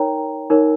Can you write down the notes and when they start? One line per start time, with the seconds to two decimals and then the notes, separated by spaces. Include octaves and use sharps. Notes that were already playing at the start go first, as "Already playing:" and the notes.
Already playing: D#4 A#4 C#5 G5 A#5
0.50 D#4 A#4 C#5